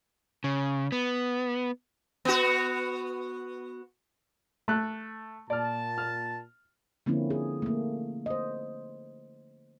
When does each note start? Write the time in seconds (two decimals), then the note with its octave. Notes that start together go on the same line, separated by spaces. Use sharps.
0.44 C#3
0.92 B3
2.25 B3 F#4
4.68 A3 F#6
5.50 A#2 D5 A5 F6
5.98 F6
7.06 D3 F3 A#3 C4 C#4 E4
7.30 G#4
7.62 A3 A#3
8.26 C5 D#5